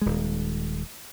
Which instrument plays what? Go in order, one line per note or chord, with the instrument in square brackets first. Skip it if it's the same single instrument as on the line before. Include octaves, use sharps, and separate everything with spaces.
[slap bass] D#1 G#3